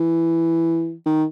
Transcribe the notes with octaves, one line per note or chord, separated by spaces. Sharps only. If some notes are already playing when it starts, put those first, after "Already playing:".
Already playing: E3
D#3